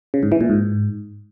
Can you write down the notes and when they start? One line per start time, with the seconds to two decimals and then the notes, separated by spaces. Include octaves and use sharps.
0.14 C#3
0.23 G#2
0.32 E3
0.41 A#2
0.50 G#2